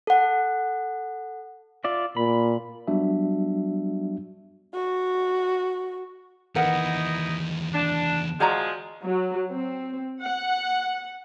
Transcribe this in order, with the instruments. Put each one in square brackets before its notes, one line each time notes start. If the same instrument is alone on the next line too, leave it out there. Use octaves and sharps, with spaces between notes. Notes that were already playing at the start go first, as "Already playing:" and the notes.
[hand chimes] A4 F#5
[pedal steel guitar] F4 D5 E5
[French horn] A#2 [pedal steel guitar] B5
[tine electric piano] F#3 G3 B3 D4 F#4 E5
[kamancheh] F#4
[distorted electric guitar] E2 D#3 [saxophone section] D#4 E4 D#5 [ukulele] A#4 B4 F#5
[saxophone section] D4
[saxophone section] F3 G#3 [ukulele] F#4 D5 A#5
[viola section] F#3
C4
F#5